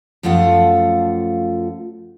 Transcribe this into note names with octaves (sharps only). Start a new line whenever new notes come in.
F#2 F3 A3 F4 F5 F#5